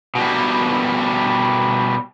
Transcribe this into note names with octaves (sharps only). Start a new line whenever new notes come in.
B2 G3